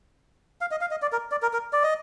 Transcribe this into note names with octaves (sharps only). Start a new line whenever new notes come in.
F5
D#5
F5
D#5
D5
A#4
D5
A#4
A#4
D5
D#5